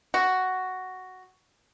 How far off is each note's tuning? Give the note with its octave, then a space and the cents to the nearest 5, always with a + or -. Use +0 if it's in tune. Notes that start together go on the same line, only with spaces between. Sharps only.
F#4 +5